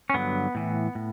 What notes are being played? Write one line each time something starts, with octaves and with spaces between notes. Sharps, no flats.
C#4
G2 D3 F#3 B3
A2 E3
A2